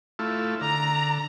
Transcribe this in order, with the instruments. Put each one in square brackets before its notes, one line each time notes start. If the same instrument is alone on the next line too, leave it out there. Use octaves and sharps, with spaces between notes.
[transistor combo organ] A3 E4 F4
[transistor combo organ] D3 [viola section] A#5